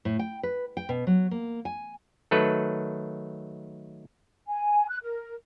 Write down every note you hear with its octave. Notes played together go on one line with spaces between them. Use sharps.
A2
G5
B4
G5
B2
F#3
A#3
G#5
D#3 F#3 A3 A4 B4
G#5
F#6
A#4